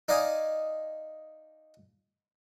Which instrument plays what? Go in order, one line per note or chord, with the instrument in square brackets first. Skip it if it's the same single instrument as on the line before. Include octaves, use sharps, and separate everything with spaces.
[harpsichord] D#4 D5 D#5 F5 G#5